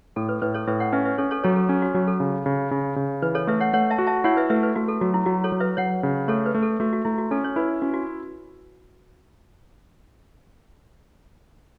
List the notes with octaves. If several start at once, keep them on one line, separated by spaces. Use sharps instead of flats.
A2 A4
B4
A2 B4
A4 C#5
A2 B4 E5
C#5 F#5
C#4 B4 E5
B4 E5
C#4 A4 C#5
A4 C#5
F#3 A4 C#5
A4
C#4 A4
F#4
F#3 F#4
A4
C#3
C#3
C#3
C#3
E3 B4
A4 C#5
A3 B4 E5
C#5 F#5
A3 C#5 F#5
E5 A5
F#4
E5 A5
E4 C#5 F#5
B4 E5
A3 B4 E5
B4
A3 F#4
A4
F#3 F#4
E4
F#3 F#4
A4 C#5
F#3
B4 E5
F#3 C#5 F#5
C#3
A3 A4 C#5
B4
A3
A4
A3 F#4
F#4
A3 E4
F#4
C#4 A4
C#5
E4 B4
C#4 F#4
F#4